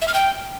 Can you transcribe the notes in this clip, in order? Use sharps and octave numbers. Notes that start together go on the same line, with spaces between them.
E5
F6
G5